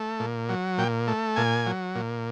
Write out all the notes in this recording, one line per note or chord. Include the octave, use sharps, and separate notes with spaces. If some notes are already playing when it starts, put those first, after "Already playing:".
Already playing: A3
A#2
F#3
A#2 G5
A3
A#2 G#5
F#3
A#2